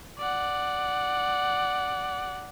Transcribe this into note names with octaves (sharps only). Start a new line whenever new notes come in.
D5 F#5